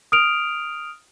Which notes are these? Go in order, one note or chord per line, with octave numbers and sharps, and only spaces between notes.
D#6 F6 D7 F7